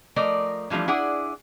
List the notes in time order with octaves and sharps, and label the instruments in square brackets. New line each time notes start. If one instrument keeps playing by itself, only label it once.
[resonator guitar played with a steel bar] F3 A3 A#4 D5 D#5
E3 F3 G3 A3 D4
D4 E4 G#4 D5 F#5